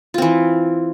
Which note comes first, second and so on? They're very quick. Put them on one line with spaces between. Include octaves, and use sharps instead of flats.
F4 C4 E3